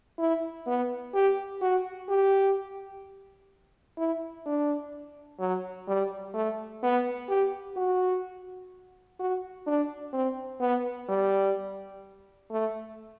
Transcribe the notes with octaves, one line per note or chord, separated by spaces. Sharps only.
E4
B3
G4
F#4
G4
E4
D4
F#3
G3
A3
B3
G4
F#4
F#4
D4
C4
B3
G3
A3